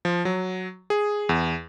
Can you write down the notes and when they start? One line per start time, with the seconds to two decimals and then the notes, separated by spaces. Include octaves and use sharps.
0.05 F3
0.25 F#3
0.90 G#4
1.29 E2